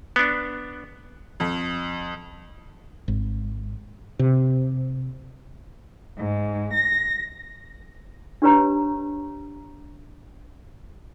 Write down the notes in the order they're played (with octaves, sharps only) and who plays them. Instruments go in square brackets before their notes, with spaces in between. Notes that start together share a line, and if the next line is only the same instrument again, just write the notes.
[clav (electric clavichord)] B3 D4
[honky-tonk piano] F2
[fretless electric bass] G#1
C3
[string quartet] G#2
A#6
[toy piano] D4 G4 B4 C#5 A#5